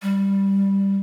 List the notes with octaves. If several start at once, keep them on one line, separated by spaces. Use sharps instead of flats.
G3